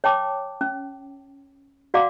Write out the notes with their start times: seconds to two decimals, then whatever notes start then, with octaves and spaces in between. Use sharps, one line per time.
0.04 C#5 G5 A5 D6
0.61 C#4
1.94 F#4 D5 F5 F#5 D6